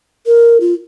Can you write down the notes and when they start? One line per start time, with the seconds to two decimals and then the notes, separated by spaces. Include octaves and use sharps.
0.26 A#4
0.61 F4